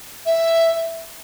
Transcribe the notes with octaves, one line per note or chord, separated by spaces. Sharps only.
E5